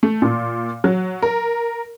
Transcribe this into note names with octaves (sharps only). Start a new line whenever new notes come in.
A3
A#2
F#3
A#4